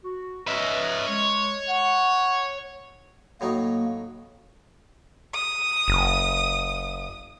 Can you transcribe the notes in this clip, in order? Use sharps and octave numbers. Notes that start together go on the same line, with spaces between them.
F#4
C#4 B4 D#5 E5
G#3 C#5
F#5
A2 F#3 A#3 D#4
D#6
F#1